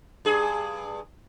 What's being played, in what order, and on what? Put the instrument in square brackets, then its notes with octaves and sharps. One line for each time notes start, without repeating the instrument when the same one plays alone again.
[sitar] G2 G#4